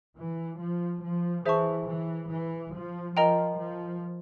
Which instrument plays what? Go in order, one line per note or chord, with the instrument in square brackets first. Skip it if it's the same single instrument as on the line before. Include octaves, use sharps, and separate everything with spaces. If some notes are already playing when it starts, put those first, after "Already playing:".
[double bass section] E3
F3
F3
[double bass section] E3 [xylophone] G#4 C5 E5 A5 C#6
[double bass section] E3
E3
F3
[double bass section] F3 [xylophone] A#4 D#5 G5 A#5
[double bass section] F3